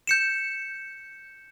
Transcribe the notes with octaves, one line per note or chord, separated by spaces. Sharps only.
G6 C#7 E7